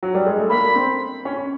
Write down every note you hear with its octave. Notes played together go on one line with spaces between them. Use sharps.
F#3
G3
G#3
A3
A#3 B5
C4
C#4